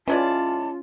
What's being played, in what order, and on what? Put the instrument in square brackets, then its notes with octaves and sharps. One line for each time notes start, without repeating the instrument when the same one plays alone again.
[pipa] E3 G#3 D5 [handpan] C#4 [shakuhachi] F4 [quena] A5